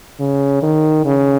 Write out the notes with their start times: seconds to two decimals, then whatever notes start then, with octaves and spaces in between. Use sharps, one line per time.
0.20 C#3
0.63 D#3
1.05 C#3